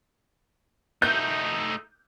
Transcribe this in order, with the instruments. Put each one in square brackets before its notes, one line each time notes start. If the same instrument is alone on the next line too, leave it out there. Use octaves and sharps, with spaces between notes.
[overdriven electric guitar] A3 D#4 [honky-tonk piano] G6